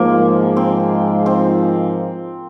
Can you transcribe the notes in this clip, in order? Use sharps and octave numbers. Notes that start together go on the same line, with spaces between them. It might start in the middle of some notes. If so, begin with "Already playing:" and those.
Already playing: G#2 F3 G#3 A#3
C4
C4